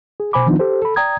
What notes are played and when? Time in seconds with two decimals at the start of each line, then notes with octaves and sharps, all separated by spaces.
0.20 G#4
0.33 B2 C5 G#5 B5 D6
0.46 D#3 F3 B3 D4 D#4 F4
0.59 G4 A4 C5
0.82 A4 B5
0.96 D5 G5 A#5 D#6 G#6